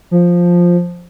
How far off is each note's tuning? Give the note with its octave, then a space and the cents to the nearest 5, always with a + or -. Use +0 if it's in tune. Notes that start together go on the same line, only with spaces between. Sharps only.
F3 +5